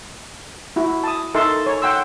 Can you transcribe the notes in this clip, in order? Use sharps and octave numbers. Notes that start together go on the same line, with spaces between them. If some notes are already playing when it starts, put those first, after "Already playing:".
E4 F#4
A5 D#6
D#4 A4 A#4 E5 A5 C6
C#5
F#5 G5 C6 E6